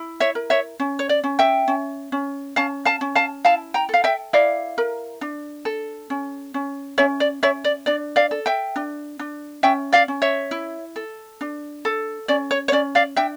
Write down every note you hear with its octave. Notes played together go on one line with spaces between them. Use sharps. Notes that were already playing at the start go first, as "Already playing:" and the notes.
Already playing: E4
C#5 E5
A#4
C#5 E5
C#4
C#5
D5
C#4
E5 G5
C#4
C#4
C#4 F5 A5
F5 A5
C#4
F5 A5
E4 F5 A5
G5 A#5
A4 F5
E5 G5
E4 D5 F5
A#4
D4
A4
C#4
C#4
C#4 C#5 E5
D5
C#4 C#5 E5
D5
D4 D5
D5 F5
A4
E5 G5
D4
D4
C#4 E5 G5
D5 F5
C#4
C#5 E5
E4
A4
D4
A4
C#4 D5
C#5
C#5
C#4 D5
D5 F5
D4 E5 G5